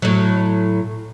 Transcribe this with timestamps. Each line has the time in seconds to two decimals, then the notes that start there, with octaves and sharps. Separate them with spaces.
0.02 A2 F#3